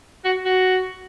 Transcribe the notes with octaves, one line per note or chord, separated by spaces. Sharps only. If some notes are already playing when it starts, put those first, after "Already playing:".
F#4
F#4